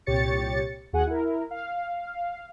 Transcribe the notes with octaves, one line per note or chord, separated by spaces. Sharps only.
C2 A#2 G4 C#5 A6 C#7
D#2 F#4 G#4 F#5 G#5
E4 A#4
F5